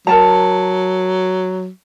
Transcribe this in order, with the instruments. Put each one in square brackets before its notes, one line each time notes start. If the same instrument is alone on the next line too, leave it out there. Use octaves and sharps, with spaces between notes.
[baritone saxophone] F#3 [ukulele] A#4 A5 A#5